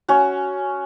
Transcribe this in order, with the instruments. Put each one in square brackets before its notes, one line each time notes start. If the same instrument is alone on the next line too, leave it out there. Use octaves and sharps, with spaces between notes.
[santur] C#4 F#4